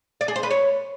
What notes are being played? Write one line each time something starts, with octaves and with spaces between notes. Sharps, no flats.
D5
G#4
C5
B4
C#5